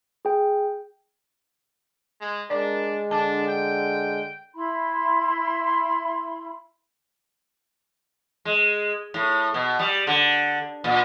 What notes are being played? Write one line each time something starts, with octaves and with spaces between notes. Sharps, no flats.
G#4 G5
G#3
G#3 D4 A#4 D5
D3 D4 A5
G5
E4 B5 C6
G#3
A2
B2
G3
D3
A#2